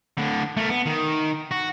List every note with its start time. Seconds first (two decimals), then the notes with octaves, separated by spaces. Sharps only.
0.17 A2 D3
0.57 A3 A#4
0.70 B3
0.87 D#3
1.51 F#4